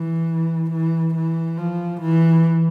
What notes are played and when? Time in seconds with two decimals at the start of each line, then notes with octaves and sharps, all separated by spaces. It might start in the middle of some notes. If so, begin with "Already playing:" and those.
Already playing: E3
0.71 E3
1.15 E3
1.58 F3
2.02 E3